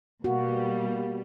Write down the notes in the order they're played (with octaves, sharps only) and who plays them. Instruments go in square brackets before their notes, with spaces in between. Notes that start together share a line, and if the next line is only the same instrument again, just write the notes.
[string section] B2 G3 [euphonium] A#3 [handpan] F#4